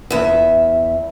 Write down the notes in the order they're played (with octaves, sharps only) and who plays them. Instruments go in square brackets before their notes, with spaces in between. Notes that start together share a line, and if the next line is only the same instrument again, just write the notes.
[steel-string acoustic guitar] E2 E5